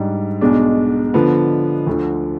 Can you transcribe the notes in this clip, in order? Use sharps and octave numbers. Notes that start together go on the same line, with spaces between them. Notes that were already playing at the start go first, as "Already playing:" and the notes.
Already playing: G#2 G3 D4
B1 B2 G#3 D4
D3 F3 B3
D2 D3 F3